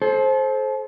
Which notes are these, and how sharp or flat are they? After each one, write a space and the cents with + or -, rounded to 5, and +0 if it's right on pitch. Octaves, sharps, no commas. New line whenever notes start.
A4 -35 C5 +15